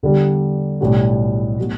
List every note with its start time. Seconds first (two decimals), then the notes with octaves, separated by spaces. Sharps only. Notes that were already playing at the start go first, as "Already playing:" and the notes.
0.03 E2 D3 G3
0.81 B1 A2 G3 D4 F#4
1.59 A2 F#3 B3 F#4